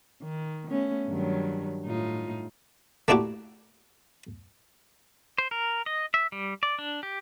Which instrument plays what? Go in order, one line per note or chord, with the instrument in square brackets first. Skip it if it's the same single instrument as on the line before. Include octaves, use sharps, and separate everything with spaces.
[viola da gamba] D#3
A3 B3 C#4
G2 D#3 F#3
A2 D#4 F4
[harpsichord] A3 A#3 D4 E4 F#4 G4
[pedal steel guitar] C5
A#4
D#5
E5
G3
D5
D4
G4